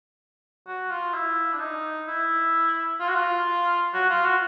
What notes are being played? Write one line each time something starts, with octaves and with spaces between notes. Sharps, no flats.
F#4
F4
E4
D4
D#4
E4
F4
F#4
F4
F#4
F4
F#4